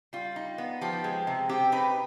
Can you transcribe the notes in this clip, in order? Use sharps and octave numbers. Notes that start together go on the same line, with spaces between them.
G3 F4
D#4
B3
F3 G4
G#3
C3
C4 G4
D#4 B4